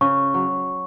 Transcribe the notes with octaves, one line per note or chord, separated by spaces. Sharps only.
C#3 C#6
F#3